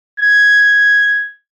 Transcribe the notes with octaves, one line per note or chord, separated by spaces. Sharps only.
G#6